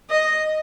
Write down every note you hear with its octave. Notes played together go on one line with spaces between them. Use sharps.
D#5